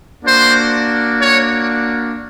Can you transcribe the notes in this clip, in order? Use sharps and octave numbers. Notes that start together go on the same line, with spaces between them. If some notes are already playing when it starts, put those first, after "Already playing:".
A#3 D4 F#4 C5
C#5